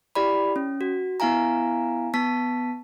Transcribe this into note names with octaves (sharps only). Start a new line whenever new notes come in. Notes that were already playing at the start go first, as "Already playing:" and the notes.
E4 G4 D5 B5
C#4
F#4
B3 E4 F5 G#5 A#5
B3 A5 B6